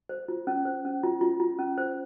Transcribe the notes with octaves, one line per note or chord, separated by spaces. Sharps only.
C5
F4
C#4
C5
C#4
F4
F4
F4
C#4
C5